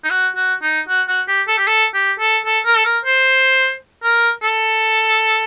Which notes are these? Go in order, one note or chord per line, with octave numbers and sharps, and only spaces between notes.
D#4
F#4
F#4
D#4
F#4
F#4
G4
A4
G4
A4
G4
A4
A4
A#4
A4
A#4
C5
A#4
A4